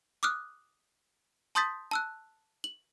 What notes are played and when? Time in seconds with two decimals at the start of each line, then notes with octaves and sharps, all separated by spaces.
0.23 D6 D#6 F6 F#6
1.55 A5 C6 D#6 G6 A6 B6
1.91 A5 E6 F#6
2.64 F#7